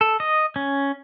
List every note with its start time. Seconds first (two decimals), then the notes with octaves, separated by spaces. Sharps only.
0.01 A4
0.20 D#5
0.56 C#4